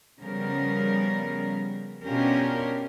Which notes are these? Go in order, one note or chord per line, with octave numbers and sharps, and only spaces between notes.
C#3 F3 G3 B3 A#4
B2 C#4 D4 F4 G4 A#4